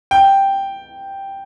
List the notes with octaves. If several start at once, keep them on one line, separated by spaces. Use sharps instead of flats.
G5